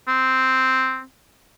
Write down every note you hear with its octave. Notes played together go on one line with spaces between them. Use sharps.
C4